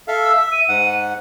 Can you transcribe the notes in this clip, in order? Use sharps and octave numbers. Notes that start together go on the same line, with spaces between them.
A4 E5 F5
E6
E5
D#7
G#2 F#5